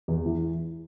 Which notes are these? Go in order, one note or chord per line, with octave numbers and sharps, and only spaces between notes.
E2
E3